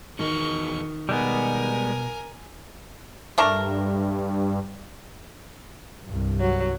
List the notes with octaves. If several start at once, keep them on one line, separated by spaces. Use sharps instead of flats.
E2 D#3 F#4 D#5 C#6
B2 G3 G#3 B3 A#4 G#5
G2 A3 D4 A#4
C2 G2
F#3